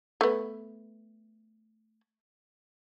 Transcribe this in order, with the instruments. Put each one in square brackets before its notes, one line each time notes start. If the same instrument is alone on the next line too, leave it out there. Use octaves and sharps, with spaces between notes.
[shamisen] A3 B3